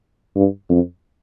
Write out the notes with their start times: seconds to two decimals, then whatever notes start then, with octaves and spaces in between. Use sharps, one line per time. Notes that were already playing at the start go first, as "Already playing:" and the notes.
0.35 G2
0.69 F2